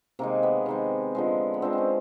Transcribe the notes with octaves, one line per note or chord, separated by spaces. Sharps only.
C3 D#3 G#3 A#3
B3
C3 D#3 G#3
D3 F3 G#3
B3
D3 F3 G#3 C4
C4 C#4